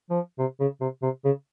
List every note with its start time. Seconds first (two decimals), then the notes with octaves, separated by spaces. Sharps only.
0.10 F3
0.39 C3
0.60 C#3
0.81 C3
1.02 C3
1.25 C#3